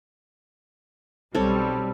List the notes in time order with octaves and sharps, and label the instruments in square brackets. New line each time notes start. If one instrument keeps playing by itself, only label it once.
[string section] B1 G3 [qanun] C4 A4 C#5